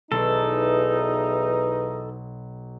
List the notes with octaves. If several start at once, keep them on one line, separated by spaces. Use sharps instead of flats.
B1 E2 E3 D#4 A4